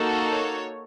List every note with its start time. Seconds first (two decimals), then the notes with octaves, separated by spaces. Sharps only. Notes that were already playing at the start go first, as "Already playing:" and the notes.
Already playing: A#3 D#4 F#4 A4
0.30 C#5